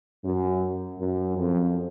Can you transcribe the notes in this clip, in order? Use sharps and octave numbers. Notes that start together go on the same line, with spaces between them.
F#2
F#2
F2